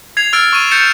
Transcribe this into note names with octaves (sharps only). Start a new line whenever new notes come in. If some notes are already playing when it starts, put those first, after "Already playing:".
G#6 C7 F7
E6 F6 A6 D7
C#6 D#7
G6 A6 C#7 E7